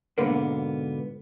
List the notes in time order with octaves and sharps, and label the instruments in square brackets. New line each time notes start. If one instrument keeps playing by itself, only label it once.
[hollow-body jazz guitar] G#2 B2 D3 A#3 B3